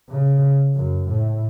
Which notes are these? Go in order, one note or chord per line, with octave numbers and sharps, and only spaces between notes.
C#3
F#2
A2